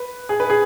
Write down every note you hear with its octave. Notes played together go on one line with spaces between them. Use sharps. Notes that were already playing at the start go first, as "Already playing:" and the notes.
Already playing: B4
G#4
B4
G#4